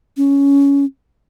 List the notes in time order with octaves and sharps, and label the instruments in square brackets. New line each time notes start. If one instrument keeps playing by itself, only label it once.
[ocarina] C#4